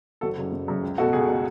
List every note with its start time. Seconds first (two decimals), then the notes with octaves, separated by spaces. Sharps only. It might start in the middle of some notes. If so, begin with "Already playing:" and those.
0.21 F#1 F#4 A4
0.37 F#2 C#3
0.52 F#1
0.68 F#2 C#3
0.83 C#2
0.98 B2 A3 F#4 A4
1.13 C#2 G#4
1.28 B2 A3